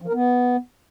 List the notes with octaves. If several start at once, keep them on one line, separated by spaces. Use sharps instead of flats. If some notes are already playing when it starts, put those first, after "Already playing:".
F3
A#4
B3